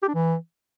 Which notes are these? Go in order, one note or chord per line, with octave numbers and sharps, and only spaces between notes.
G4
D4
E3